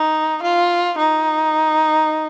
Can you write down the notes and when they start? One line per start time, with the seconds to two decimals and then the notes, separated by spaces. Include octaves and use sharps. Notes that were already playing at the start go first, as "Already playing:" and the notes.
Already playing: D#4
0.43 F4
0.98 D#4